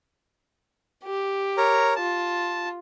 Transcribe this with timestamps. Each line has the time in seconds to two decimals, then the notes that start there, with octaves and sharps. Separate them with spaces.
1.04 G4
1.58 A#4 C#5 A#5
1.96 F4 A5